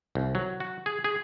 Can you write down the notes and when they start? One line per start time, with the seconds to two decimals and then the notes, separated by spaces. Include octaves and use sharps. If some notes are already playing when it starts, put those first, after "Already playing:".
0.15 C2
0.35 F#3
0.60 F#4
0.86 G#4
1.04 G#4